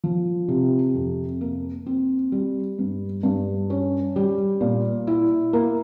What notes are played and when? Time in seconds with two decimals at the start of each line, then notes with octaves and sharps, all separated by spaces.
0.04 F3
0.48 C3
0.94 F2
1.41 A#3
1.86 C4
2.32 G3
2.79 G2
3.23 G2
3.70 C#4
4.16 G3
4.61 A#2
5.07 E4
5.53 A#3